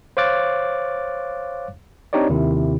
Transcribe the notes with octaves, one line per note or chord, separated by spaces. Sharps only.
C5 C#5 F5 D6 F#6 A6
C4 D4 D#4 G4 C#5 D5
D#2 C3 D#3 E4